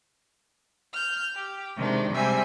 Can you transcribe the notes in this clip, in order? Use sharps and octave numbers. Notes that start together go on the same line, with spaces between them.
F6 G6
G4
C3 D#3 G#3 D4
C3 G3 G#3 C4 E5 G#5